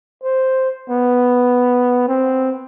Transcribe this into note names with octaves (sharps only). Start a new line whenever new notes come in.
C5
B3
C4